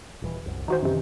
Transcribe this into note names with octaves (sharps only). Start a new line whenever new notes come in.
D#1 E3
C2 F#2
D#3 E3 D#4 F#4 C5
F#2 C3